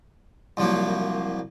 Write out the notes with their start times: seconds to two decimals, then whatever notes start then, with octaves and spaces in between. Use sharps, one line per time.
0.57 C2 F3 F#3 A#3